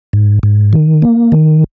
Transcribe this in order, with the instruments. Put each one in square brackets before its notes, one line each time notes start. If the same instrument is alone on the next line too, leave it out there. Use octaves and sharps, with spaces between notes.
[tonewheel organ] G#2
G#2
D#3
A#3
D#3